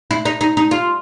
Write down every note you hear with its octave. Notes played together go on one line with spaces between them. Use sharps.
E4
D#4
D#4
D#4
F4